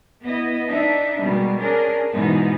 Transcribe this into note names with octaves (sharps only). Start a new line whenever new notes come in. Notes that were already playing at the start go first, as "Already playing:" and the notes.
B3 E4 D#5
D4 D#4 E5
B2 G3 G#3 A#3
C#4 D4 G#4 A#4
G#2 B2 E3 G#3 B3 D#4